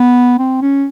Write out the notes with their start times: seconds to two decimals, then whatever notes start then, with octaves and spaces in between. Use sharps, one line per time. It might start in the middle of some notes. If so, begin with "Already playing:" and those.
Already playing: B3
0.38 C4
0.62 C#4